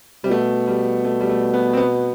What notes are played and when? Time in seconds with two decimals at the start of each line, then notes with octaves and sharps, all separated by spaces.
0.24 C3 G3
0.31 B2 A3
0.67 G3
1.05 A3
1.21 G3
1.29 A3
1.53 B3
1.73 C4
1.77 B3